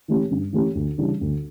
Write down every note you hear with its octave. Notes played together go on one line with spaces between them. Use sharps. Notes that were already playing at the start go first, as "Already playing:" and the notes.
E3 A3 C#4 G4
G2
E3 A3 C#4 G4
D2
C#3 E3 G3 D4
D2